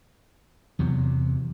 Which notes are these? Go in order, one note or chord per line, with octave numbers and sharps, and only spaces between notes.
E2 C3 F#3